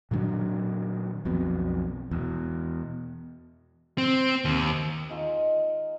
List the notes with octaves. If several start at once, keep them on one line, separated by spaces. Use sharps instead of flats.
A#2 D#3 F#3 D4
B1 F2 B2
E2 B2
C4
D#2
G#3 D#4 F4